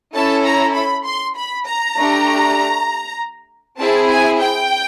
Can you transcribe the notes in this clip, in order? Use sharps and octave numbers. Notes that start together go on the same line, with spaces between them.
C#4 E4 A4 A5
A#5
B5
C6
B5
A#5
A3 D4 G4
C4 E4 G#4 A5
G#5
G5